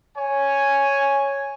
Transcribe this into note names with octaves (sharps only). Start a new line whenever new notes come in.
C#5 G#5